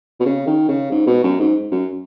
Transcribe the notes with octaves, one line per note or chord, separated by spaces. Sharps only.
B2
C#3
D#3
C#3
G#2
B2
F#2
G#2
F#2